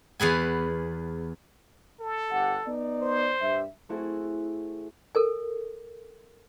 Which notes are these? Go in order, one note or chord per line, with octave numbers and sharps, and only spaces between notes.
E2 G#4 B4 G#5
A4
G1 G4 F#5
B3 D#4 D5
C5
G2 G3 E5
A3 C4 E4 F#4 G#4 A4
A4 A#4 G#5